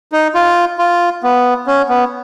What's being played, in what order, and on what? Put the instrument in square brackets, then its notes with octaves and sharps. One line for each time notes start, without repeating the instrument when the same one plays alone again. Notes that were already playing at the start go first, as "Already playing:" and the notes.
[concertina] D#4
F4
F4
B3
C#4
B3